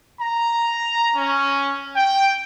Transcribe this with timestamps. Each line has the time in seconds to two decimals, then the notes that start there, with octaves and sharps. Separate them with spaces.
0.19 A#5
1.14 C#4
1.95 G5